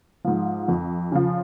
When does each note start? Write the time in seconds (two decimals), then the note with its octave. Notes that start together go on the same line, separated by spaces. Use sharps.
0.25 G#2 F3
0.68 F2
1.12 C#3 F3